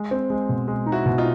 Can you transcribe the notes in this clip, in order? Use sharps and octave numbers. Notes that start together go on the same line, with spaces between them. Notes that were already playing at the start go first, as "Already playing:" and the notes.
Already playing: G#3
C4
G#3
B2
G#3
D#4
E4 F#4
B2
D#4 F4